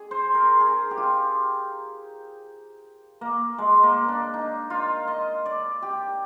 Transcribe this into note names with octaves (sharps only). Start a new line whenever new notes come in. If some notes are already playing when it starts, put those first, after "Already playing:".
Already playing: G#4
C5
A#4
G#4
G4
F4
A#3
G#3
A#3
D4
D#4
F4
D#5
D5
G4